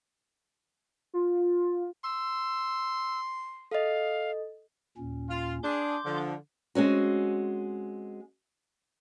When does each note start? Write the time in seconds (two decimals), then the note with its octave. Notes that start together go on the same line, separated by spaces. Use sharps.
1.14 F4
2.04 C6 E6
3.71 A4 D#5 F5
4.97 D#2 A#2 C#4
5.30 F4
5.63 D4 G#4 C6 D6 G6
6.05 D3 F3
6.75 G#3 C4 C#4 F#4